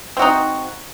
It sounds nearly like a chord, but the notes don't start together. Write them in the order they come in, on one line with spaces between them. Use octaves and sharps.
C4 F#4 D#4